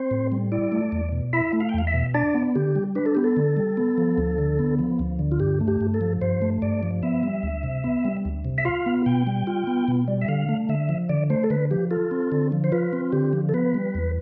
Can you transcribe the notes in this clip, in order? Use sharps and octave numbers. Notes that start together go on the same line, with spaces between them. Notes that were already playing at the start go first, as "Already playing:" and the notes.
Already playing: C4 C5
A2
G3
E4 D5
A3
E2
B2
E4 E5
A3
F5
G5
E2 F5
E5
B2
D4 D5
B3
D3 G4
G3
D4 B4
A4
B3 G4
A4
D3
G3
B3
F3
D2
D3
B3
F3
D2
D3
F4
G2 G4
A3
G4
G2
A4
F3
G2 C5
A3
G2 D5
F3
B3 E5
G3
D2
C3
B3
G3
D2
C3
E5
F4 F5
B3
B2 G5
G3
F4
B3
B2
G3
E5
D3 F5
A3
D3 E5
F3
D3 D5
A3 C5
A4
D3 B4
F3 G4
F4 A4
C4
D3
F3
C5
F4 B4
C4
D3 G4
F3
A4
B3 B4
G3
E2